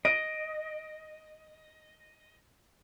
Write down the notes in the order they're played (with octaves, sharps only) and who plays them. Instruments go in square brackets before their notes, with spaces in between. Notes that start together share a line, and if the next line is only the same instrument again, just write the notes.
[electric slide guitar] D#5 [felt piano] D7